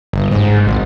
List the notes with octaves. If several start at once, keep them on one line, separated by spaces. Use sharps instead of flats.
G1
G#2
G#1